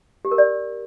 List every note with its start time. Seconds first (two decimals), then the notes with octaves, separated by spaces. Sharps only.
0.25 G4
0.31 A#4
0.38 D5